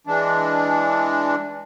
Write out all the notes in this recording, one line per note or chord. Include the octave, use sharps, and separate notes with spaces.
E3 G#3 D4